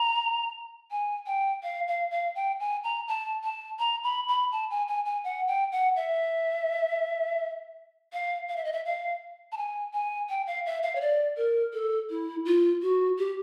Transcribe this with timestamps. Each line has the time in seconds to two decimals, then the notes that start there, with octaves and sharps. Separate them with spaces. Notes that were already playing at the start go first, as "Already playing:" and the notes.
Already playing: A#5
0.91 G#5
1.27 G5
1.63 F5
1.88 F5
2.11 F5
2.35 G5
2.60 G#5
2.84 A#5
3.08 A5
3.44 A5
3.79 A#5
4.04 B5
4.28 B5
4.52 A5
4.70 G#5
4.88 G#5
5.05 G#5
5.24 F#5
5.48 G5
5.72 F#5
5.96 E5
8.13 F5
8.48 F5
8.56 E5
8.65 D#5
8.73 E5
8.85 F5
9.52 A5
9.58 G#5
9.94 G#5
10.29 G5
10.47 F5
10.66 E5
10.83 F5
10.96 C#5
11.01 D5
11.37 A#4
11.73 A4
12.10 E4
12.45 F4
12.82 F#4
13.19 G4